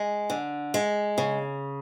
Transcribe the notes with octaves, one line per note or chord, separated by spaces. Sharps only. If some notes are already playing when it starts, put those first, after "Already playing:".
Already playing: G#3
D3
G#3
C#3